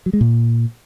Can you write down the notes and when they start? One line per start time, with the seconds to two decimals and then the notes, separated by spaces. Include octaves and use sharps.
0.06 F#3
0.13 G#3
0.21 A#2